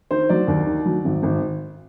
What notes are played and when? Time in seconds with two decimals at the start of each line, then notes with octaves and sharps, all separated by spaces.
0.11 D#3 C5
0.29 F#3 D5
0.48 D#2
0.67 D#3
0.86 F#3
1.05 G#1
1.23 G#1